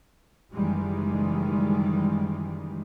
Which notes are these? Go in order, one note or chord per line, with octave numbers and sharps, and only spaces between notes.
F#1 D#3 E3 G3 G#3